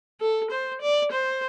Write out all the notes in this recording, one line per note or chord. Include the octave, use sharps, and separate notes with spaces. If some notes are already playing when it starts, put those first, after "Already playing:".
A4
C5
D5
C5